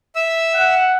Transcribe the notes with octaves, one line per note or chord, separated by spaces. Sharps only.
E5 E6
F#5